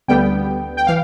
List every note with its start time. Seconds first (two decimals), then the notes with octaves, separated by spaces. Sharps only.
0.08 D2 D3 G3 B3 G5
0.77 G5
0.87 E3 F5